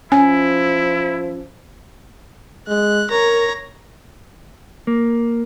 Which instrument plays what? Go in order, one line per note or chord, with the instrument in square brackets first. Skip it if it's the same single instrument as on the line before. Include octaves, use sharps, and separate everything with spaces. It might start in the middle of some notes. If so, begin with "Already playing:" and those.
[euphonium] F3 [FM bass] C#4 [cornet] E4 [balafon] G#5
[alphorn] G#3 [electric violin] F#6
[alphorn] A#4 [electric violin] C#5 A#5
[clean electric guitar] A#3